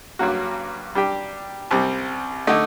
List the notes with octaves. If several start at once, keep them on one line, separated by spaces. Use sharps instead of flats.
G2 F#3 A#3 F#4
G3 D4 G4
C2 C3 G3 C4
D3 A3 D#4